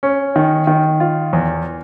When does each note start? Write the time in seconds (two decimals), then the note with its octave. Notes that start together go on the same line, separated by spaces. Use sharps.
0.03 C#4
0.36 D#3
0.67 D#3
1.00 F4
1.33 E2